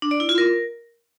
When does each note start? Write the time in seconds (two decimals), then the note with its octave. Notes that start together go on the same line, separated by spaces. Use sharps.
0.02 D4
0.11 D5
0.20 E4
0.29 F4
0.38 A#4